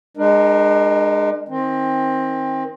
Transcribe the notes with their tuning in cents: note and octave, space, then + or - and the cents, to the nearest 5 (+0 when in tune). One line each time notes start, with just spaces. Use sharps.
G#3 -10 D4 +35 A#4 +15
D#3 +30 C4 +20